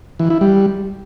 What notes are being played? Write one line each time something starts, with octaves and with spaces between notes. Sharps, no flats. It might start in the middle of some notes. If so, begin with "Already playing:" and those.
E3
E4
G3